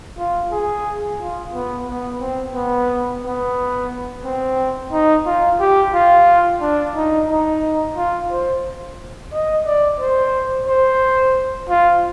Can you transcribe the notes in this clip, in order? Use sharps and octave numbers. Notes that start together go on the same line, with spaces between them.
F4
G#4
F4
B3
B3
C4
B3
B3
C4
D#4
F4
G4
F4
D4
D#4
D#4
F4
C5
D#5
D5
C5
C5
F4